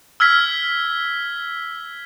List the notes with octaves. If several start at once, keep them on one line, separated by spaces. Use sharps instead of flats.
E6 F6 G#6 B6